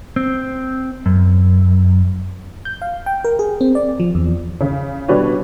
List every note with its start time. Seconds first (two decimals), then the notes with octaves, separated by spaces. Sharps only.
0.16 C4
1.06 F#2
2.65 G6
2.82 F5
3.06 G5
3.25 A#4
3.39 G#4
3.61 C4
3.75 D5
4.00 F3
4.15 E2
4.61 C#3
5.08 B2 G3 D4 F#4 B4 C#5